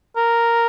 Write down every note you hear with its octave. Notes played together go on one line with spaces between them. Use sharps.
A#4